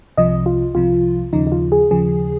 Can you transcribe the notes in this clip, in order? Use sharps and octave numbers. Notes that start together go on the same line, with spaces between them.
C2 C3 F3 D#5
F4
C2 C3 F3 F4
D#2 C#3 F3 D#4
D#4
F4
G#4
D#2 C#3 F3 G#4